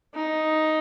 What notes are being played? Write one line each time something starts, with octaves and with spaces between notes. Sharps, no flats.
D#4